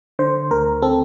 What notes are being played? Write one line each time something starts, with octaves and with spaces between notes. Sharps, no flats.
D3 C5
D2 A#4
C4 A4